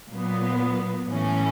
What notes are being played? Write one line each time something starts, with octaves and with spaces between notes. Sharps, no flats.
A#2 F#3 B3
A2 E3 A3 C#4